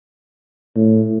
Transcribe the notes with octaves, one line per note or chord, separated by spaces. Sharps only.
A2